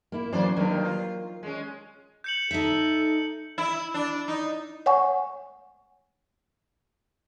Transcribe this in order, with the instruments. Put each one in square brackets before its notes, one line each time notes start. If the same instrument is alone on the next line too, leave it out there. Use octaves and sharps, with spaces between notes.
[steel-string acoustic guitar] A#3 E4
[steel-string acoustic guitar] E3 F#3 C#4 [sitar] A#3 C5 D5
[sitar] G2 D#3 [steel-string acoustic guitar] F#3 A#3
[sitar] F4
G#3 C#4
[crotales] G6 C#7 F#7
[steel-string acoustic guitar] D#4 E5 [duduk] A4
[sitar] E4
D4
D#4
[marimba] C#5 F#5 G#5 C#6